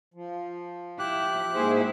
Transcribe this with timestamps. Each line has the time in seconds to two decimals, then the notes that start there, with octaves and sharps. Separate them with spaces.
0.14 F3
0.99 E4 G4 F#6
1.55 G#2 A#3 E4 G#4 C5